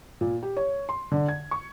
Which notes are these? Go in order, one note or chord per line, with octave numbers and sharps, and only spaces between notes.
A#2
G4
C#5
C6
D3
G#6
C#6